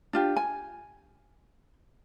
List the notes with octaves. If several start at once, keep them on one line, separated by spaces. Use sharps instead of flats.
D4 F4 G4
G#5